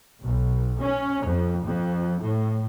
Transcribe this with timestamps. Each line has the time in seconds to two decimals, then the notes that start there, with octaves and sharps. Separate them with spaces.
0.22 B1
0.80 C#4
1.25 F2
1.65 F2
2.21 A2